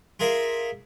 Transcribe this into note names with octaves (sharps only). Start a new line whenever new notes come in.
F4 G#4 A#4 E5